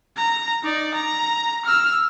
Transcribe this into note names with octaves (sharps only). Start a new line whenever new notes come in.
A#5
D#4 D5
A#5
E6 F6